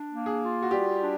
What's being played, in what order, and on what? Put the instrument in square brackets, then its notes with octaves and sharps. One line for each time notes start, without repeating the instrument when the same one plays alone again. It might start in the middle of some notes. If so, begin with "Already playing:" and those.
Already playing: [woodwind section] D4
A#3
[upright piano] G#4
[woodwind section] F4
[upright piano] F#4
[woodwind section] G3 [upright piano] G4
[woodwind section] D4